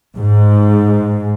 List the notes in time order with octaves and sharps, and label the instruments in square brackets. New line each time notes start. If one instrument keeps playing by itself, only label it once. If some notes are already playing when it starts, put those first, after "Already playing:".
[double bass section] G#2